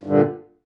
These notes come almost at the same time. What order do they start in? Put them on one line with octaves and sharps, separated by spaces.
G2 D3 A#2